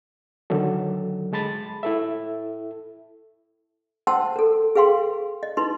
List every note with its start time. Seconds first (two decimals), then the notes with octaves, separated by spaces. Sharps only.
0.50 D3 D#3 F#3 A4
1.33 G#3 A5 B5 A6
1.83 E4 A4 E5
4.07 C5 F#5 G5 A5 C6 E6
4.36 A4 A#4
4.75 G#4 B4 F5 G5 C6
5.43 D#5
5.57 D#4 E4 B4 C6